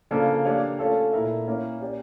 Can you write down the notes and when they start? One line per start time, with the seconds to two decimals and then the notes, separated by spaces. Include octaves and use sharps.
0.11 C#3 F3 A#3 D4 A4
0.45 A#3 D4 G4 C#5 F5
0.79 A3 C#4 F4 A4
1.13 A#2 A3 E4 A#4 E5
1.47 A#3 C#4 E4
1.81 C#4 G4 D5